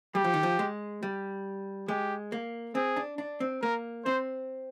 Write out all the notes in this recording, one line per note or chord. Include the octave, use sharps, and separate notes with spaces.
G3 G4
F3
D#3
F3
G#3
G3
G#3 G4
A#3
C4 G#4
D4
D4
C4
A#3 A#4
C4 C5